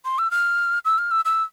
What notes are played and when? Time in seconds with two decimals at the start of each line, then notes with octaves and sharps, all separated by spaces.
0.05 C6
0.18 E6
0.31 F6
0.85 E6
0.98 F6
1.11 E6
1.25 E6